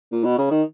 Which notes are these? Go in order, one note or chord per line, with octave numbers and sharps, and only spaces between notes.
A#2
B2
C#3
D#3